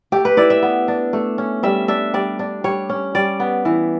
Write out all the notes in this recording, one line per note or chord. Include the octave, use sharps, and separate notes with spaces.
A3 G4
B4
E4 D5
E5
B3
D4
A3
C#4
G3 E5
D4 E5
G3 D5
D4
G3 C#5
C#4
G3 D5
B3
E3